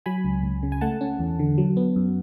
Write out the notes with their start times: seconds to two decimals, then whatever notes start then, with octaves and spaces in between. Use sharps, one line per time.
0.06 F#3 G#5 B5
0.25 C#2
0.43 C#2
0.63 C#3
0.72 G#5
0.81 A3 F#5 A5
1.01 C#4
1.19 E2
1.39 D3
1.58 F#3
1.77 B3
1.96 F#2